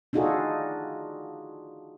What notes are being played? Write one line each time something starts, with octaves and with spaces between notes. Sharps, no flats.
D4 D#4 F4 F#4 G#4 A4